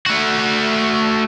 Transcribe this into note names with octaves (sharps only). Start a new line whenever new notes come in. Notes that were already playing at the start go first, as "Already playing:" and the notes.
A3 F#4